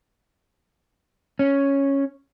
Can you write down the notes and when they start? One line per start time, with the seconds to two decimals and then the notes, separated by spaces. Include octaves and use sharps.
1.39 C#4